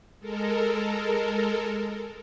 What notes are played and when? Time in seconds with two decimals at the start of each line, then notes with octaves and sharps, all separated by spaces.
0.19 G#3 A4 A#4